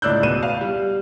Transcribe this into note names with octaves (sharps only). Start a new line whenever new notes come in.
C#2 A2 D5 E6 F#6 G6
B2 F#6 D#7 E7
F5
G3